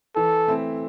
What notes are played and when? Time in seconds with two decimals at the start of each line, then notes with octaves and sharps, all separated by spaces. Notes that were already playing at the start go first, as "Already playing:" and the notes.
0.16 E3 A4
0.48 A3 C4 E4